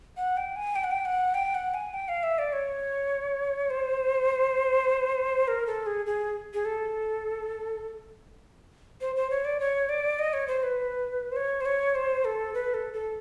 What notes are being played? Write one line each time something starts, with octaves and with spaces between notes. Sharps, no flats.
F#5
G5
G#5
G5
F#5
G5
F#5
G5
F#5
G#5
G5
F5
E5
D5
C#5
C5
A#4
A4
G#4
G#4
G#4
A4
C5
C5
C#5
D5
C#5
D5
D#5
C#5
C5
B4
C5
C#5
C5
C#5
C5
A4
B4
A4
A4